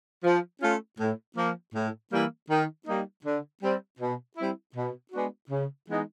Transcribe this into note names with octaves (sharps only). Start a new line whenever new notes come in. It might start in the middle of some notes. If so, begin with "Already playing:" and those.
F3
A3 C#4 F4
A2
F3 A#3
A2
E3 G3 A#3
D#3
G3 A#3 D#4
D3
G3 C4
B2
G3 C4 E4
B2
G#3 B3 D4 F#4
C#3
E3 G#3 B3 D#4